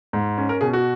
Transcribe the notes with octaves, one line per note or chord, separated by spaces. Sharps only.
G#2
C#4
A#4
B2 G#4
F#4